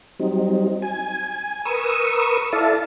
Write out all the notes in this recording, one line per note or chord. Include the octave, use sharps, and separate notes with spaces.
F#3 G3 C4 D#4
G#5
G#5
A#4 B4 C#6 D#6 E6
E4 A4 D5 E5 F5 A5